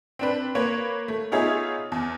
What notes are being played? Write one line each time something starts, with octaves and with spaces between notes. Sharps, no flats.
C4 D4 B4
A#3 B4 C#5
A3
B3 D#4 F4 G#4 C#5 E5
E2